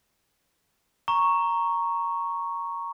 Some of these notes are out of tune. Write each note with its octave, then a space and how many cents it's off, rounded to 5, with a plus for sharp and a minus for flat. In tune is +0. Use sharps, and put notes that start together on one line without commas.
A#5 +0 C#6 +0